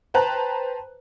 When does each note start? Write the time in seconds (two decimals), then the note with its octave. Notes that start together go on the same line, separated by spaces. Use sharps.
0.14 B4 C5 G5 A5 A#5 F#6